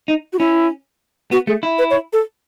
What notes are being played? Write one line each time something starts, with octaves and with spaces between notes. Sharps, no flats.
D#4
F#4
C#4 E4
B3 F#4
A3 G#4
E4
B4
C#5
A4